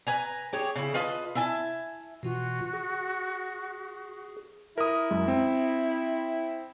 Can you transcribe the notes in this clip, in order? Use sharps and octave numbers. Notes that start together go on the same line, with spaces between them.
B4 G#5 A#5
G4 G#4 C#5
C#3 E4
F4 B4 D#5 A5
E4 E5 G#5 A5
B2 E3 F4 F#4
G#4
E4 A#4 D#6
F#2 G#3
C4